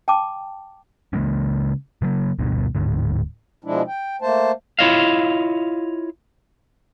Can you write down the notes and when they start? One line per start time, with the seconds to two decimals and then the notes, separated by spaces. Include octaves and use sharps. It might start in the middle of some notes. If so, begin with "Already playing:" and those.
0.08 G5 A5 D6
1.13 C#3 G#3 A#3 C#4
2.02 C#3 F#3 G#3 A#3
2.39 D1 A1 G2 B2
2.75 D1 G#2 D3
3.64 B2 F3 G#3 D4 E4
3.88 G5
4.22 A3 A#3 C5 A5
4.79 E4 F4 C#5 D#5 F5